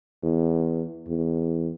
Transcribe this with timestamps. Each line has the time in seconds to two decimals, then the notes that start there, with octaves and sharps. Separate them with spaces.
0.23 E2
1.08 E2